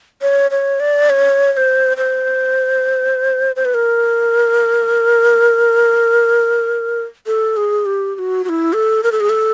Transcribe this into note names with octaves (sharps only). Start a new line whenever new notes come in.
C#5
C#5
D5
C#5
C#5
C5
C5
C5
B4
A#4
A4
G#4
G4
G4
F#4
F#4
E4
A4
A#4
A4
G#4
A4